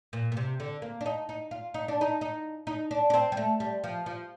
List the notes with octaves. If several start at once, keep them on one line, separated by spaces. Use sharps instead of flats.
A#2
A#2
C3
D3
A#3
D4
D#4
D#4
F4
D#4
D4
D#4
D#4
D#4
D4
D4
C4
G3
A3
G3
F3
F3